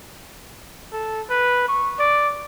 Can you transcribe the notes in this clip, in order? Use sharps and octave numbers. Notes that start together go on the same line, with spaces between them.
A4
B4
C#6
D5